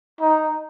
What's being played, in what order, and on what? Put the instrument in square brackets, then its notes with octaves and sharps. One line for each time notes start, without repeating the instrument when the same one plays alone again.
[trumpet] D#4